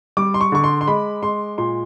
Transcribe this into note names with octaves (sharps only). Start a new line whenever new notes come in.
G3 D6
C6
C#6
D3 C#6
C6
C6
G#3 B5
G#3 C6
A#2 C6